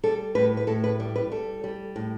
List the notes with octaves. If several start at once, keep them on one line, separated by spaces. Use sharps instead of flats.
G3 A4
A2 B4
B4
A2 A4
B4
G3
B4
G3 A4
G3
A2